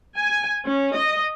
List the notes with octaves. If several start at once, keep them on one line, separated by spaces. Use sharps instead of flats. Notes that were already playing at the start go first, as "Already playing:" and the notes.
G#5
C#4
D#5